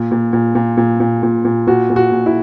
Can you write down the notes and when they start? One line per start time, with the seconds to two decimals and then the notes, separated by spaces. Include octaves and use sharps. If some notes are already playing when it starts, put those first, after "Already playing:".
Already playing: A#2
0.11 A#2
0.33 A#2
0.55 A#2
0.77 A#2
1.00 A#2
1.23 A#2
1.45 A#2
1.67 A#2 F#4
1.90 A#2
1.96 F#4
2.12 A#2
2.26 E4